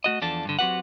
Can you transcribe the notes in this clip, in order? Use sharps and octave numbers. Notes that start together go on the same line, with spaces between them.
A3 F#4 D#5
E2 F3 D4 A4 A5
G2 D3
F#3 C4 F#4 G4 B4 F#5